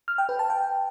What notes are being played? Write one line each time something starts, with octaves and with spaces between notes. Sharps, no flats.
F6
G5
B4
A5
G5